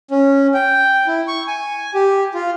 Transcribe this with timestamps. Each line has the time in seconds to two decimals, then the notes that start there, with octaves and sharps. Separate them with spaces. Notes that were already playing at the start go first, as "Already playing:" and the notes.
0.11 C#4
0.54 G5
1.07 E4
1.28 C#6
1.48 G#5
1.94 G4
2.34 F4